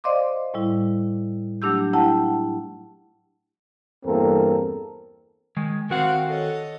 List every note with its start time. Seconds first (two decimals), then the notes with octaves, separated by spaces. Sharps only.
0.04 C5 D5 D#5 F5 C6 D6
0.54 A2 G3 E4
1.62 F#3 A3 D4 G4 E6 G6
1.94 E4 G4 F#5 G5 A5 A#5
4.06 E2 G2 A#3 C4 A4 A#4
5.57 D#3 G#3
5.90 D#3 C4 F#4 F5 F#5
6.26 A4 C#5 D#5